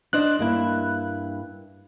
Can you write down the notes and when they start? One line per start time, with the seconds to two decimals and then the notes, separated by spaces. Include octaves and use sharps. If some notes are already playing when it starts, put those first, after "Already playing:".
0.13 D4 C5 D#5 F#6
0.39 G2 A#3 E4